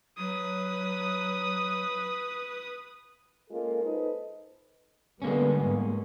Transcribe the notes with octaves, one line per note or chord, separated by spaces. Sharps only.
F#3 B4 D#6
G#3 A#3 C#4 F4 A4 A#4
D#4 A4 B4 C5 D#5
D3 G3 G#3 A#3 B3 C#4
G#2